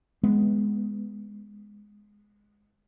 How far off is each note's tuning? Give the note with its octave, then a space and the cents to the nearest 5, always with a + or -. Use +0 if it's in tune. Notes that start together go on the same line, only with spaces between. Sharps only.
G#3 +0 B3 +0